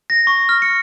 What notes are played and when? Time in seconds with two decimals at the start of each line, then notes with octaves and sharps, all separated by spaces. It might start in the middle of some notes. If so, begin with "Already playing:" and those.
0.10 A#6
0.27 C#6
0.49 F6
0.62 C#7